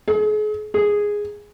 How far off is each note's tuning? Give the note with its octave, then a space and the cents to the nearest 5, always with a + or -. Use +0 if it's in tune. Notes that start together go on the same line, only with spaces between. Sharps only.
G#4 +40
G#4 -5